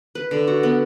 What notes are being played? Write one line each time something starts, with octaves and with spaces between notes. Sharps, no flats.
B4
D3
F#4
B3